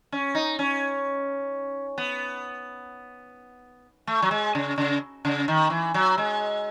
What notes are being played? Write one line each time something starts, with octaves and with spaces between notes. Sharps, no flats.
C#4
D#4
C#4
B3
A3
F#3
G#3
C#3
C#3
C#3
D#3
E3
F#3
G#3